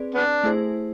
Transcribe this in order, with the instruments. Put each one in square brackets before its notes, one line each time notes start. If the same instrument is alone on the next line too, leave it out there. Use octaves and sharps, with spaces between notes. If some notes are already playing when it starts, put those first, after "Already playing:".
Already playing: [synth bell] C4 G#4 B4 D5
[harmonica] B3 D4
[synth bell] A3 E4 G#4 C5